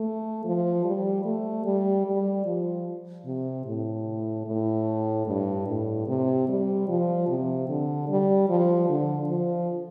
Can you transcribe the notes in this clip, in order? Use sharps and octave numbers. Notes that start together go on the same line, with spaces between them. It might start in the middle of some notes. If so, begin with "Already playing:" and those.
Already playing: A3
F3
G3
A3
G3
G3
F3
C3
A2
A2
G2
A2
C3
G3
F3
C3
D3
G3
F3
D3
F3